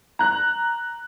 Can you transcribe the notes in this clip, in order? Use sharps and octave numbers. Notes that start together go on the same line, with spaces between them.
A#5 F#6